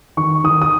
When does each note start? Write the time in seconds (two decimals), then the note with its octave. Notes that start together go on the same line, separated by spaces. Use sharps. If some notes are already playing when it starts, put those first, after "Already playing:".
0.17 D#3 C#6
0.44 D#3 D#6
0.62 D#6